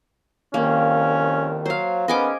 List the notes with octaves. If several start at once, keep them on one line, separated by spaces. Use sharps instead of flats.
C2 F2 D#3 A#3 C#4
F#3 C5 F5
D#3 G#3 B3 C#4 D#5 G#5 D6